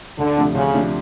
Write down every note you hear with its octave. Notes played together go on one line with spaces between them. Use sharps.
D2 D3
C3 F3 A3 D4
D2 C#3
C3 F3 A3 D4